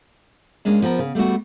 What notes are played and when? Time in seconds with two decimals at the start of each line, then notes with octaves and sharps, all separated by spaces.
0.65 G#3 A#3 C#4 D4
0.82 F3 B3 G4 A#4
0.99 C#3
1.15 G3 A3 B3 F#4